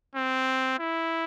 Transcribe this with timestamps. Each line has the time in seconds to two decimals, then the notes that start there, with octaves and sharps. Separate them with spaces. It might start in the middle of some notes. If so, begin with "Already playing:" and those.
0.15 C4
0.79 E4